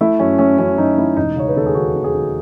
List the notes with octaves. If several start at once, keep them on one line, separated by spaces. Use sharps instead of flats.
A3 E4
F#2 C#4
A3 C#4
F#2 C#4
F#2 D#4
A3 E4
E1 D#4
C#3 C#5
B4
D#2 A4
G#4
D#2 F#4
D#2
G#4
D#2